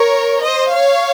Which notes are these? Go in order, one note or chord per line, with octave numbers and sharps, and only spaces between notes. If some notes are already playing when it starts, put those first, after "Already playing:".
Already playing: A#4 C#5
C5 D#5
C#5 F5